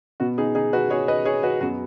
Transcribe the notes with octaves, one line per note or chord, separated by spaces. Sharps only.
B2 B3 F#4
D#4 G#4
D#4 G#4
F#4 B4
G#4 C#5
B4 D#5
G#4 C#5
F#4 B4
F#2 F#3 B3 F#4